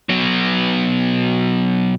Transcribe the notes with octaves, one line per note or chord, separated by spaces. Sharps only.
B2 F#3